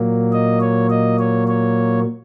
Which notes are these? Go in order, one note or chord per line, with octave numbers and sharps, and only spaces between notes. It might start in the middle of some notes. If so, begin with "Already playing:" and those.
Already playing: A#2 F#3 A#3
D#5
C#5
D#5
C#5
C#5